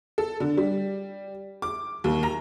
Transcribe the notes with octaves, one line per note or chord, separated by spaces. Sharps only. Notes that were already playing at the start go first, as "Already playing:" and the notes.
A4
D3
G3
D6
D#2
A#5